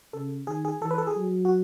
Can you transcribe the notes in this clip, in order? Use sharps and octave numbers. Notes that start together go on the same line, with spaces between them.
C#3 A4
D#3 G#4
G#4
E3 A4
B4
A4
G#4
F#3
F#4